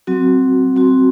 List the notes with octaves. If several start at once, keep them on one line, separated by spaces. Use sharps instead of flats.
F#3 C4 F#4
F#3 C4 F#4